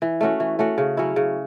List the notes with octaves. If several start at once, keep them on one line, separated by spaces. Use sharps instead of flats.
E3
A3 C#4 F#4
E3
A3 C#4 F#4
C#3
F#3 C#4 E4
C#3